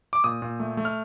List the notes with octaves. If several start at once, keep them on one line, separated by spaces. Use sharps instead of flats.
D6
A#2 D#6
A#2
A3
A3
F6